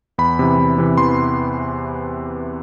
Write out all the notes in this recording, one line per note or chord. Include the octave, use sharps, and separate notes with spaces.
E2 B5
C3 E3
E2
C3 E3
E2 C6